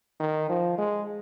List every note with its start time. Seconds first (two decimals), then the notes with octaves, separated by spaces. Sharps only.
0.20 D#3
0.49 F3
0.78 G#3